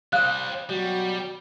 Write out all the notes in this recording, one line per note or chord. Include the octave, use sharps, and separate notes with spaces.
G3 C5 F5 D#6 F#6
B2 F#3 G3 F#4